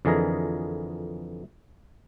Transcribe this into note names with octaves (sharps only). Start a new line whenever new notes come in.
F2 D3 E3 G#4 A#4 D#5